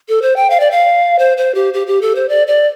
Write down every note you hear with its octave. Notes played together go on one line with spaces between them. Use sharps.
A4
C5
G5
F5
D5
F5
C5
C5
G4
G4
G4
A4
C5
D5
D5